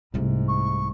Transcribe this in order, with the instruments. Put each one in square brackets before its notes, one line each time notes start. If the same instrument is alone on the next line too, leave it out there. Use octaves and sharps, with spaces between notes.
[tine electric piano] C2 [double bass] G#2 [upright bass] C3 A3
[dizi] C#6